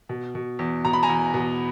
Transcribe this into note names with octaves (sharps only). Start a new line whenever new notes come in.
B2
B2
E2
B2 A#5
B5
G#5 A#5
E2
B2